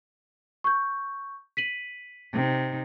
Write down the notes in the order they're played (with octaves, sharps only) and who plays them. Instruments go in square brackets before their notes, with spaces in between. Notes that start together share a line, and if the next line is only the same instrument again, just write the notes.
[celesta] C#6 G6
B6 D#7 F#7
[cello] C3 D#4